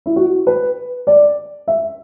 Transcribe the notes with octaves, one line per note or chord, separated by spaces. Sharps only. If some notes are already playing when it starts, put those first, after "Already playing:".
E4
F#4
B4
D5
E5